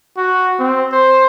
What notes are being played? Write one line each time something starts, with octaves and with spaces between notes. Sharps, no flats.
F#4
C4
C5